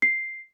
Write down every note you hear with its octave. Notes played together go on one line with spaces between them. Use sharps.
C7